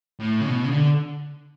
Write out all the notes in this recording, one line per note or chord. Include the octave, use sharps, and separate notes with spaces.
A2
C#3
B2
C#3
D3